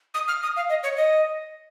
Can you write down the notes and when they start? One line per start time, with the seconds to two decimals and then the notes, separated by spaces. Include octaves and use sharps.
0.14 D#6
0.28 F6
0.43 D#6
0.56 F5
0.69 D#5
0.83 C#5
0.96 D#5